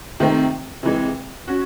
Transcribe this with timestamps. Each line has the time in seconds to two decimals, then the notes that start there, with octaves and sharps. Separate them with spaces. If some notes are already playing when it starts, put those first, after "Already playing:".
0.20 C3 D#3 A3 C4
0.83 C3 E3 G#3
1.48 C#4 F#4